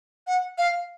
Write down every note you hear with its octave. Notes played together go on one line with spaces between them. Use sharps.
F#5
F5